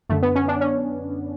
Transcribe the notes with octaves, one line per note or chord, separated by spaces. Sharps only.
F#2 D3 A3
B3
C#4
D4
C#4